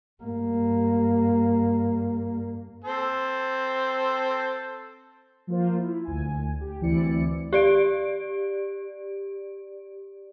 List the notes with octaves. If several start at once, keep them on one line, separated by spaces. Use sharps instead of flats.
G2 A#3
C4 A4
F3 A#3 F4 C5
E4
D2 G#5
G4
D2 E3 C4 E4 D5 C#7
G4 D5 D7